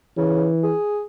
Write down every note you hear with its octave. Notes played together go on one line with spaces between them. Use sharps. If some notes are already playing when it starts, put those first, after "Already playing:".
C#3 E3
G#4